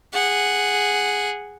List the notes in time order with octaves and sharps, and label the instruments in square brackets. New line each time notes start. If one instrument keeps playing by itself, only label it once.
[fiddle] G#4 F#5